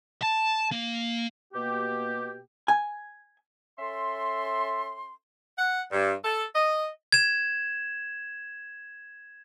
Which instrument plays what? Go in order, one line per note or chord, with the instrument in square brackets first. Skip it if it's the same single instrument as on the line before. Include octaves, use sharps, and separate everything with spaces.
[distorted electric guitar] A5
A#3
[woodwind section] B2 A#3 G4
[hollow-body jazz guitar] G#5
[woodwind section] C#4 A4 E5 C6
[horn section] F#5
G2
A4
D#5
[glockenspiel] G#6 E7